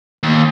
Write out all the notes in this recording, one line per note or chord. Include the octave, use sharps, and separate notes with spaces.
D#2